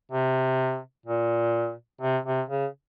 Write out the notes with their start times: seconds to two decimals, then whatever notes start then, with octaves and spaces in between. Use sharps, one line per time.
0.12 C3
1.06 A#2
2.01 C3
2.26 C3
2.49 C#3